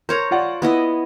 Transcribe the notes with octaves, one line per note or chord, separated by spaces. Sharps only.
A#4 C5 C#5 A#5
F4 D5 F#5
B3 E4 D#5